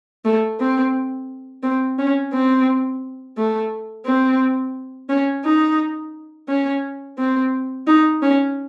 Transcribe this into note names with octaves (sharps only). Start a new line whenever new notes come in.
A3
C4
C4
C#4
C4
A3
C4
C#4
D#4
C#4
C4
D#4
C#4